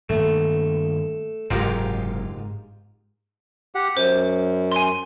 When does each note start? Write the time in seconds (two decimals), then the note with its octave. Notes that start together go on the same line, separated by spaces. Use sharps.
0.09 G2 D#3 A3 A#3
1.50 F#1 G#2 C3 F4 G4 A#4
3.75 G4 F#5
3.97 F#2 C5
4.72 G#5 C6